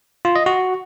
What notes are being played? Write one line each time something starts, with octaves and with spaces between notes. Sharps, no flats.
F4
D#5
F#4